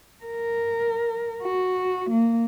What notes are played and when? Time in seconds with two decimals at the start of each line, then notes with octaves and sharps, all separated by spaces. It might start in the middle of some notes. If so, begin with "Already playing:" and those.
0.24 A#4
1.43 F#4
2.10 A#3